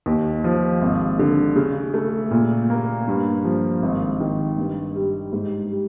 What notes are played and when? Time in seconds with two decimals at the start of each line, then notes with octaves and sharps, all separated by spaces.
0.06 D#2
0.44 F3
0.81 G#1
1.19 D3
1.56 C#3
1.94 A3
2.31 A#2
2.70 A#3
3.08 G2
3.45 F3
3.82 G#1
4.20 D#3
4.58 G2
4.95 G3
5.32 G#2
5.71 G3